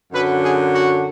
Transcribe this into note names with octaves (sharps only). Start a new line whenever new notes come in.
F#2 D3 F#3 B4
G#4
F#4